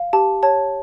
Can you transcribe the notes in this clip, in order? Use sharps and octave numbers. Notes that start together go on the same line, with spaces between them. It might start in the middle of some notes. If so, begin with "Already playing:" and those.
Already playing: F5
G4 A5
C#5 A5